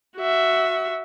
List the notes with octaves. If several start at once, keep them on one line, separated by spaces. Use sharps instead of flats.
F#4 E5